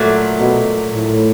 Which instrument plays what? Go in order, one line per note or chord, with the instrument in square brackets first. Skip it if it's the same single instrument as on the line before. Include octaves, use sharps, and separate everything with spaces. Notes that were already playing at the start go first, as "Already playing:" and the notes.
Already playing: [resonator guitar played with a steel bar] A#2 F#3 A3
[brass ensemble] B2
A2